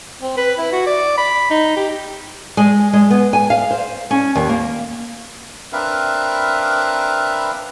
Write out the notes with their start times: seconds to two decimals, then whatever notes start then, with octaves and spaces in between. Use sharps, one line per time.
0.22 C4
0.37 B4
0.58 E4
0.72 F#4
0.87 D5
1.18 B5
1.51 D#4
1.77 G4
2.57 G#3
2.93 G#3
3.10 B3
3.33 G#5
3.50 F5
3.71 C5
4.11 C#4
4.35 D#2
4.49 A#3
5.73 C4 D4 A#4 B4 E5 F5